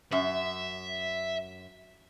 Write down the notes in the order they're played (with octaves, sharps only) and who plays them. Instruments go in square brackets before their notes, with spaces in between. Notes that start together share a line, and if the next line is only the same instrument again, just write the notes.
[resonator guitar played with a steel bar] F#2 [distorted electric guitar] E5